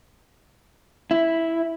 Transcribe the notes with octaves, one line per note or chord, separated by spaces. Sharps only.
E4